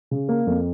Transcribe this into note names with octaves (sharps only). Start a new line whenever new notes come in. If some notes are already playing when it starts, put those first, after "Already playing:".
C#3
A#3
F2